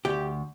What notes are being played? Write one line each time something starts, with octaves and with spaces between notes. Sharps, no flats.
D2 G4